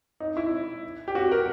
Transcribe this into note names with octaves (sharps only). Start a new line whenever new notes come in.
D#4
E4
G4
F#4
A#4